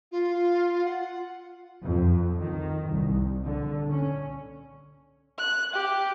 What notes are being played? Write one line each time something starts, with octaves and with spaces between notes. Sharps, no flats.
F4
F#5
F2
D#3
C2
D3
C#4
F#6
G4